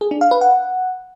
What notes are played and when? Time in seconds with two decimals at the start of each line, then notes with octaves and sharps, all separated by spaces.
0.01 G#4
0.11 D4
0.21 F5
0.31 B4
0.41 F#5